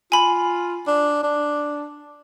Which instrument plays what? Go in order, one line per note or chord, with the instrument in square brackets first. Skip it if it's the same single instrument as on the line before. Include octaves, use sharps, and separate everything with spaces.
[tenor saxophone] F4 [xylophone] G#5 B5
[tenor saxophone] D4
D4